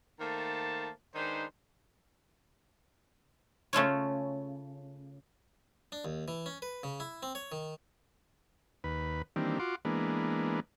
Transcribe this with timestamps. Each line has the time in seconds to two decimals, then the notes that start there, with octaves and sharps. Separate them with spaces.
0.20 D#3 A3 A#3 C5 A5
1.15 D#3 G#3 D4 D#4 B4 C5
3.73 C#3 A3 F4 C#5
5.92 D4
6.05 D#2
6.28 E3
6.46 C#4
6.62 B4
6.83 C#3
7.00 E4
7.23 C4
7.35 C#5
7.52 D#3
8.84 D#2 B4
9.36 D#3 E3 G3 A#3 C4 D4
9.59 F4 F#4 C6 D6
9.85 E3 G#3 A#3 B3 D4